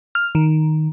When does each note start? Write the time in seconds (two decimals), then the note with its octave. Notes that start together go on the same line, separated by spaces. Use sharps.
0.15 F6
0.35 D#3